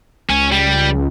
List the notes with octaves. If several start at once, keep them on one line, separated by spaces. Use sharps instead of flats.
C#2 C#4
G3